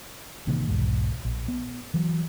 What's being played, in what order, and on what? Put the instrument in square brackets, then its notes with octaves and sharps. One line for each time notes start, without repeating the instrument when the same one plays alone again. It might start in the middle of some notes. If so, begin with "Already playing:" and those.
[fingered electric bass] A1 C3 D#3 A#3
B1 E2 G#2
A#1
B3
E3 F#3